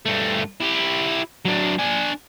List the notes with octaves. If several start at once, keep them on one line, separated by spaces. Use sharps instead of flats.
G2 A3
E4 G4
F#3 D4
D4 G#5